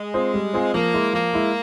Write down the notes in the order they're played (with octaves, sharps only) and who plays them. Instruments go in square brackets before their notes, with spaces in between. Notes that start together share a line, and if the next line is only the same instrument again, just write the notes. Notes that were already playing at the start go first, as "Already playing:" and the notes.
Already playing: [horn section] G#3
[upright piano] C4 F4 G#4 C5
G3
C4 F4 G#4 C5
[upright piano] F3 [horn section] A#3
[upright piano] G#3 E4
[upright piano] F3 [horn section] A#3
[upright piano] G#3 E4